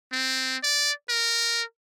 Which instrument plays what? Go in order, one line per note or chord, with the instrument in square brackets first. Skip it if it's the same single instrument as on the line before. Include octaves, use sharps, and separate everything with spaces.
[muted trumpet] C4
D5
A#4